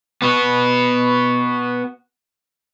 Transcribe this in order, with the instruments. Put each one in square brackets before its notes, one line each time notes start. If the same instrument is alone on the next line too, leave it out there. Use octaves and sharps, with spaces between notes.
[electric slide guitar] B3 F#4